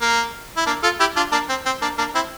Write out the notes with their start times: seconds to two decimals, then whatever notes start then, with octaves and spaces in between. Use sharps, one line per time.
0.01 A#3
0.57 E4
0.66 A#3 D4
0.83 F4 A4
1.00 E4 G4
1.16 D4 F4
1.32 A#3 D4
1.49 C4
1.66 C4
1.82 A#3 D4
1.98 A#3 D4
2.14 C4 E4